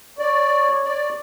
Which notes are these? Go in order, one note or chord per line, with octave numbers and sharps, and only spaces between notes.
C#5 D5
D5